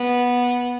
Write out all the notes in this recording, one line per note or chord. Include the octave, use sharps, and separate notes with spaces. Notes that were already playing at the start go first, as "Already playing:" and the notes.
Already playing: B3